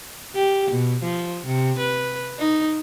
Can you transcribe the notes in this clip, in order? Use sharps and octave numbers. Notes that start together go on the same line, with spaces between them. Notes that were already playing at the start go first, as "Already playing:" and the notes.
G4
B2
F3
C3
B4
D#4